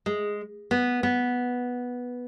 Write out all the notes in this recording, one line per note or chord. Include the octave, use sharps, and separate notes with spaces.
G#3
B3
B3